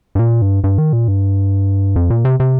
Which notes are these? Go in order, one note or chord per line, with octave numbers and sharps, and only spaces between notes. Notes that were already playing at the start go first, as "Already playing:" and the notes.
G2
A#2
G2
G2
D#3
A#2
G2
F2
A#2
C3
C3